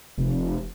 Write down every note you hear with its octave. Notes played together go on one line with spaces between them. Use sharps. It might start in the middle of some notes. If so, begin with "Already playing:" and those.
F1